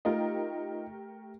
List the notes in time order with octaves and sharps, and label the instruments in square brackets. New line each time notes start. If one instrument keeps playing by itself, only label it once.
[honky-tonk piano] A3 G4 A#4 [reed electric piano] D#4 F4 D#5